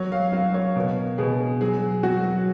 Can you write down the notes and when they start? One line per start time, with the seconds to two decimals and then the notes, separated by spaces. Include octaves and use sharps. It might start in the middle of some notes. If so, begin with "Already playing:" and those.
Already playing: F#3 C#5
0.12 F5
0.33 F#3 F5
0.54 C#5
0.76 B2 A#4
1.18 B2 G#4
1.61 F#3 G#4
2.03 F#3 F#4